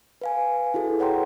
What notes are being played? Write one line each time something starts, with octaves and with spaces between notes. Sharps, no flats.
B4 F5 G#5
E4 F#4 G#4 A4
B4 C#5 F#5 G5 A#5 C6